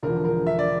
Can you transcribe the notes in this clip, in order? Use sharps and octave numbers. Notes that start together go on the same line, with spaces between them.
E1 E2 D3 F3 A#4
A#4
E5
D5